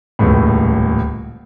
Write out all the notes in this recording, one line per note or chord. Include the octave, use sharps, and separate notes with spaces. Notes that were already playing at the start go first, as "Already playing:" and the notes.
D#1 C#2 A2